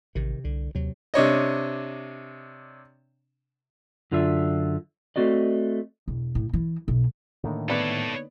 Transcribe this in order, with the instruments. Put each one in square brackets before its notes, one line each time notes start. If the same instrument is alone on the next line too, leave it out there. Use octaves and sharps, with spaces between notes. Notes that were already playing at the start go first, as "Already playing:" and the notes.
[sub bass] A1 [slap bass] C3 D#3
[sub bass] C2 [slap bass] D3
[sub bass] D#2 [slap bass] C3 F#3
[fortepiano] C3 D4 C#5 D#5
[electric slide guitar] F#2 D3 F4 D5 E5
A3 C4 F#4 D5 D#5
[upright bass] E1
A2
E3
B1
[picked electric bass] A2 D#3 [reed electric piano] D3 A#3 D#4
[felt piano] B3 B4 D5 [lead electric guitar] A4 C#5